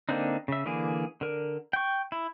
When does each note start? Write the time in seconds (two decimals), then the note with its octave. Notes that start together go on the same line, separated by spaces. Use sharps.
0.09 D3 A#3 C4 D4 D#4
0.48 C#3 E5
0.66 D3 E3 A#3 G#4
1.21 D3 A#4
1.73 G5 C#6
2.12 E4